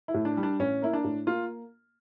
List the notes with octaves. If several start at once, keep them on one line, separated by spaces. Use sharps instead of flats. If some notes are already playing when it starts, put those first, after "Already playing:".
E4
A2
D4
G3
D4
A1 C#4
A#3 E4
D4
A2
A#3 F4